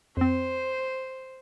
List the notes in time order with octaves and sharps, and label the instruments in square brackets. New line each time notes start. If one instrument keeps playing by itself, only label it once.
[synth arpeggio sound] F2 C4 [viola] C5